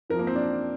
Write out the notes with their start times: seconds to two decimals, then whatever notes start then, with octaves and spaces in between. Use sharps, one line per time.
0.10 F2 F3 A#4
0.19 A#3
0.27 C4
0.35 D4